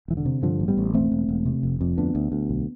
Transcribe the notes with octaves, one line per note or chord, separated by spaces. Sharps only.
E1 E3
D3
C3
G2 D3 F3
A1
G3 B3
A1
E1 A3 C4
E1
E1
C3
F1
F2
D2 B3 D4
D2
D2
B1